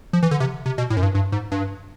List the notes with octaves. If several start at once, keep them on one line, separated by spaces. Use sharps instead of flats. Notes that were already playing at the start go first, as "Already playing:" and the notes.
F3
E3
D3
C3
C3
B2
A2
F#2
G2
G2
G#2
G2